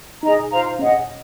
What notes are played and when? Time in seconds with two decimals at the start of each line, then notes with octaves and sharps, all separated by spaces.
0.23 D#4 G#4 D#5 A#5
0.51 F4 C5 F5 A#5
0.79 C#4 G#4 D#5 F#5